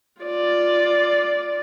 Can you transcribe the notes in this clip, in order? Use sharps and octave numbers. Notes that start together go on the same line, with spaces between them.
F4 D5